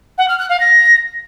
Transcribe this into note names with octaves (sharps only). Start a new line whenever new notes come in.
F#5
F6
F#6
F5
A#6